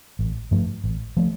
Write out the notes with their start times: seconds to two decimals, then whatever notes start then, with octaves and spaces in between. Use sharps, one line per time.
0.19 A1
0.51 G2 F3 A3
0.84 A1
1.17 F3 A3